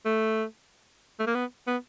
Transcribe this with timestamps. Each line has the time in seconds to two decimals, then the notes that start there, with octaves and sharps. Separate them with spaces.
0.05 A3
1.20 A3
1.27 A#3
1.35 B3
1.67 B3